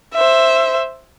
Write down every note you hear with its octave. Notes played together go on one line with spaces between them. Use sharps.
C5 E5